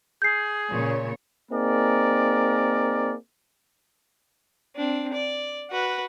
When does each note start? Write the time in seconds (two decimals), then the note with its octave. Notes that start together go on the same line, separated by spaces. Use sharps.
0.22 G#4 G6 C7
0.69 A#2 C#3 C#5
1.51 A#3 C4 D#4 G#4 A#4 D5
4.76 C4 D4
5.13 D5
5.71 F#4 B4